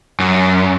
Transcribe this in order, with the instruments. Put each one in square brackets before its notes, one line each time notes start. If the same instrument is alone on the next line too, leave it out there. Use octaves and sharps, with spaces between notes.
[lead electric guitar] F#2